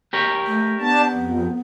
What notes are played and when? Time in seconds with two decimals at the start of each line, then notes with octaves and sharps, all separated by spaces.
0.13 G4 A#4 C#5
0.47 A3
0.80 B3 D4 A5
1.15 F2